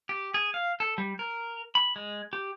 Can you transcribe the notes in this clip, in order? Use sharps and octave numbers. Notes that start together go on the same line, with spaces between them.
G4
G#4
F5
A4
G3
A#4
B5
G#3
G4